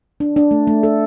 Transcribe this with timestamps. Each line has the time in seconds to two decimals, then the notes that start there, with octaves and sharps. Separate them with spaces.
0.20 D4
0.36 D4
0.51 A3
0.67 A3
0.83 A4